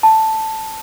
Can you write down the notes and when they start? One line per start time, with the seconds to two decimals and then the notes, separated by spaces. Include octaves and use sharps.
0.03 A5